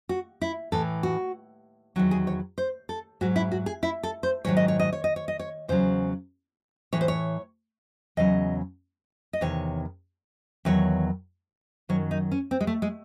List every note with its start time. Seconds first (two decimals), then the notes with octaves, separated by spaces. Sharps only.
0.09 F#4
0.41 E4
0.72 A2 E3 A4
1.03 F#4
1.96 E2 D#3 F#3 F#4
2.11 G#4
2.27 C#5
2.58 C5
2.89 A4
3.21 G#2 F#3 F#4
3.36 E4
3.52 F#4
3.66 G#4
3.83 E4
4.03 A4
4.23 C5
4.45 G#2 D#3 F#3 C#5
4.57 D#5
4.68 C#5
4.79 D#5
4.93 C#5
5.04 D#5
5.16 C#5
5.28 D#5
5.39 C#5
5.68 E2 C#3 F#3 C5
6.93 A2 E3 C#5
7.01 C5
7.08 C#5
8.17 E2 C#3 F#3 D#5
9.33 D#5
9.41 E2 C3 D#3 C#5
10.65 E2 D#3 F#3 C#5
11.89 F#2 D#3 F#3 C#5
12.11 D#4
12.32 C#4
12.51 C4
12.61 G#3
12.67 A3
12.82 G#3